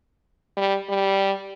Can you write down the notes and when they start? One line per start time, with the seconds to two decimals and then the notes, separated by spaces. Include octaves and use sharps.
0.57 G3
0.89 G3